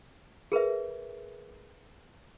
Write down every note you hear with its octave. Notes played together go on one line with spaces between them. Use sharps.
G#4 A#4 B4 E5